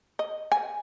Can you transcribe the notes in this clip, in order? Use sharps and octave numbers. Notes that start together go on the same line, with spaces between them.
D#5
G#5